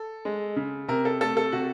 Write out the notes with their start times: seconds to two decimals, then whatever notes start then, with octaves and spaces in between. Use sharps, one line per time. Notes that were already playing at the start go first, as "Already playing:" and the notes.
Already playing: A4
0.25 G#3
0.56 C#3
0.88 C3 A#4
1.05 A4
1.21 A3 A4
1.37 A4
1.52 C3 F#4